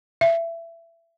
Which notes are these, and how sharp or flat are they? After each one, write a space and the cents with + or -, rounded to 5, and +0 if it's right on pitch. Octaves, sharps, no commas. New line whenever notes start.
E5 +25